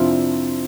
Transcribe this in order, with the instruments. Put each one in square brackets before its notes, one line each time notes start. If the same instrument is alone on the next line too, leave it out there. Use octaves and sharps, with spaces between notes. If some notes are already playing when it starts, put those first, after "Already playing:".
Already playing: [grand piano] F2 C3 F3 C4 E4 [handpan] D4 F4